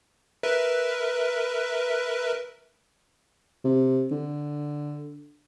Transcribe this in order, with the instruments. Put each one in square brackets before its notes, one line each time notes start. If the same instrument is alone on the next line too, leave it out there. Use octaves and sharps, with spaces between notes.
[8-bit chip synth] A#4 B4 E5
[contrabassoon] C3
D3